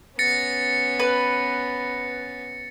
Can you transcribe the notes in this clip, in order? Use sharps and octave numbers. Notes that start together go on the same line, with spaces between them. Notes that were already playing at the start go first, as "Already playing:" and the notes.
B3 C#4 A6 A#6 C#7
B4